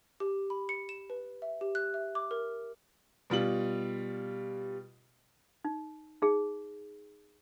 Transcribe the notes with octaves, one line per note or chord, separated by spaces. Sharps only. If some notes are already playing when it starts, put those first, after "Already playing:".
G4
B5
C#7
E7
B4
E5
G4
F#6
E5
D6
A#4
B2 G3 F4 F#7
D#4
D#4 G#4